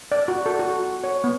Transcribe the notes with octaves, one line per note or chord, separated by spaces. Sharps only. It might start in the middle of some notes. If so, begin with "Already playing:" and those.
D5
F#4
A4
F#4
C#5
B3